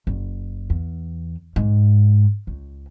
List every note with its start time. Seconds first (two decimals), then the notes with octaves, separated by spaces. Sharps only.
0.07 F#1
0.70 E2
1.56 G#2
2.47 C#2